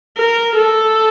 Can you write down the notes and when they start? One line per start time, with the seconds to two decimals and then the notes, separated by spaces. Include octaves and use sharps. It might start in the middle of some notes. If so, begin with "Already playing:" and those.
0.17 A#4
0.55 A4